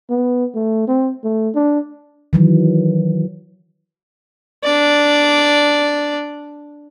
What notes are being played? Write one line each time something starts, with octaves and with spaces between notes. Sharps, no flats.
B3
A3
C4
A3
D4
D#3 E3 F#3
D4 D5